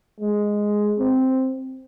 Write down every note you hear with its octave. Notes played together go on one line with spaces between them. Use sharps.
G#3
C4